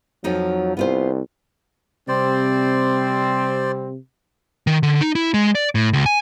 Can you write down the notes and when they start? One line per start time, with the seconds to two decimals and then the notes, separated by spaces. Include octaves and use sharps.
0.24 F2 F3 F#3 D#4
0.77 C2 B3 F4 C5
2.08 C3 G3 C4 C5 D5
4.67 D#3
4.83 D3
5.01 D#4
5.15 E4
5.34 G#3
5.55 D5
5.75 A2
5.93 C#2
6.06 G#5